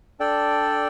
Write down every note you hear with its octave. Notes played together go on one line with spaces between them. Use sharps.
D4 A4 D5 G5